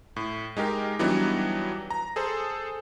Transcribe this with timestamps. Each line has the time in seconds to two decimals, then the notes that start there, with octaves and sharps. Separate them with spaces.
0.16 A2
0.57 G#3 D#4 G4 A#4
0.99 E3 F#3 G3 B3 D4 D#4
1.90 A#5
2.16 G#4 A4 C5